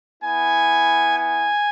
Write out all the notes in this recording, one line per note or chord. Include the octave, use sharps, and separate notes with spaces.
B3 E4 G#5
G#5